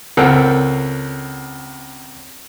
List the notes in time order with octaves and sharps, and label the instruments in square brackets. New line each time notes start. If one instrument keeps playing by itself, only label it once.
[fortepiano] C#2 C4 A4 A#4 F#5